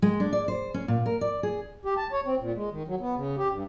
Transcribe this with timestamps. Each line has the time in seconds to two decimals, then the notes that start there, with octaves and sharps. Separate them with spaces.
0.02 G#3
0.20 D4
0.33 D5
0.48 C5
0.74 C#4
0.88 A#2
1.06 A#4
1.21 D5
1.43 G#4
1.85 G4
1.97 A5
2.12 C#5
2.26 C4
2.40 A#2
2.55 G#3
2.71 D#3
2.87 F#3
3.00 B3
3.16 C#3
3.38 G4
3.51 G2